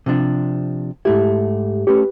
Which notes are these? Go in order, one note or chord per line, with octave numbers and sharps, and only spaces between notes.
C3 F3 D4
G#2 A3 E4 G4
A3 C#4 G4 B4 C#5